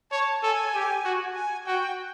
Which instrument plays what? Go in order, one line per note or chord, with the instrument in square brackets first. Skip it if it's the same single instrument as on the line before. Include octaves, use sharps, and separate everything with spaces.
[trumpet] C#5 [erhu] A5
[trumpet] A4 [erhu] G#5
[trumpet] G4
F#4
[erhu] G#5
[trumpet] F#4 [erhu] G5